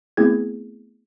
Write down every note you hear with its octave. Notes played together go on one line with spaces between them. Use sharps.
A3 B3 C4 E4 G#4 G#6